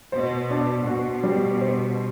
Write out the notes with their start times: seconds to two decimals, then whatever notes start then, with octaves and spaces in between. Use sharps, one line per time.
0.12 B2 C5
0.50 D4
0.86 B2 F#4
1.24 G3
1.61 C5